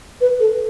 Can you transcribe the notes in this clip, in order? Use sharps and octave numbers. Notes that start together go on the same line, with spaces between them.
B4
A4